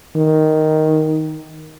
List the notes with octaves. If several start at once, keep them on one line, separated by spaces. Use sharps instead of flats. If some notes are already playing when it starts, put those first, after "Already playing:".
D#3